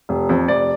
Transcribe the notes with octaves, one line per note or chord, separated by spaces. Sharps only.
F1
F2
F1 D5